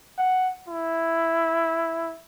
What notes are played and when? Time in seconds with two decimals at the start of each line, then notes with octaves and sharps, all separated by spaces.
0.18 F#5
0.68 E4